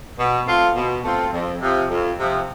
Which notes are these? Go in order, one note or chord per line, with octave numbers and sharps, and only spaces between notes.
B2
A3 C4 F4
B2
A3 C4 F4
F2
C3 F3
F2
C3 F3